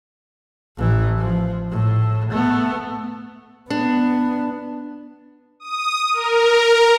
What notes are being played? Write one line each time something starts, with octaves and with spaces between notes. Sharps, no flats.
A1 E3
F3
A2
A3 B3
B3 D4
D#6
A#4